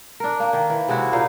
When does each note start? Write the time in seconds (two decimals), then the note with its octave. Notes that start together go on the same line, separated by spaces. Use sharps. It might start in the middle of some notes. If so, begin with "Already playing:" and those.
0.20 D4 A#4
0.40 A#3
0.53 D#3
0.70 E3
0.88 C3 G#3 E4 F#4
1.13 A#2 D#4 F5